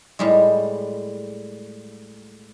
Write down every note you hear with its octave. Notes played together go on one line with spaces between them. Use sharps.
A2 G3 G#3